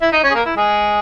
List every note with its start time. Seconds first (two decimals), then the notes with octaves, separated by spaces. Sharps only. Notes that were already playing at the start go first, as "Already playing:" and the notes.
0.01 E4 E5
0.12 D#4 D#5
0.24 C#4 C#5
0.30 G#4
0.34 A#3 A#4
0.46 E4
0.57 G#3 G#4